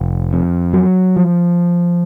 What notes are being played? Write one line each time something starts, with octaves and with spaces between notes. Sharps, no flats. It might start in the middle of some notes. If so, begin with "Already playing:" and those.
Already playing: F1
F2
F#3
F3